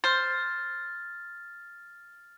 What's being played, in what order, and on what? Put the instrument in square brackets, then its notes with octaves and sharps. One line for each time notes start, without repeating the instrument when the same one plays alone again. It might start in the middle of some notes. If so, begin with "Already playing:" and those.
[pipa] C5 [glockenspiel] F6 A6